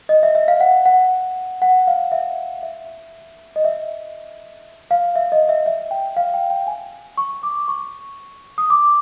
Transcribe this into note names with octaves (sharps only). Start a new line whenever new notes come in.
D#5
E5
E5
F5
F#5
F#5
F#5
F5
E5
E5
D#5
E5
F5
E5
D#5
E5
E5
G5
F5
G5
G5
G#5
C#6
D6
C#6
D#6
D6